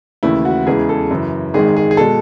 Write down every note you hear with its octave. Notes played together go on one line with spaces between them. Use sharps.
D#2 C#3 E3 A3 E4
F#4
E2 C#3 E3 G#3 G#4
A4
F#2 C#3 E3
G#1 G#2 D#3 G#3 G#4
G#4
G#4
B2 G#3 A4